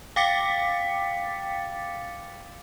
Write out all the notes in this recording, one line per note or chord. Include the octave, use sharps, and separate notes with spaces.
F5 G5 D6 A6 B6 C#7